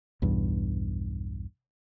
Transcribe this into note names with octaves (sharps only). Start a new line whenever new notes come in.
B1 E2 G2